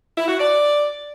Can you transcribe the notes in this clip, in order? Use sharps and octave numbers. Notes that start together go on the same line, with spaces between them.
E4
F#4
D5